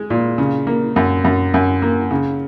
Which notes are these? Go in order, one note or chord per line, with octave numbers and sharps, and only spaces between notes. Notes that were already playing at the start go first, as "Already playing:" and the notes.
Already playing: G#3
A#2
C#3
A#3
F#2
F#2
F#2
A#3
C#3